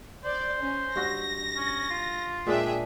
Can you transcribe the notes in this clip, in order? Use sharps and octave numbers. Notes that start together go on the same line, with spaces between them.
C5 D5
C#4
G2 F#4 A#6
C#4
F4
A#2 G#3 D4 G#4 E5 G5